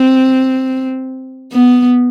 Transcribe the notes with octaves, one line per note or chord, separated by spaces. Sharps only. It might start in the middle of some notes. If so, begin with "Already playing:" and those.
Already playing: C4
B3